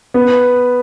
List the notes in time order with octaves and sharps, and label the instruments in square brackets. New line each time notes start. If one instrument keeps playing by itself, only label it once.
[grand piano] B3